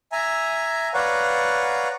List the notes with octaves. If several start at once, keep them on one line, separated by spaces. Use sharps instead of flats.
E5 G#5 A#5
B4 C#5 D5 F5 F#5 A#5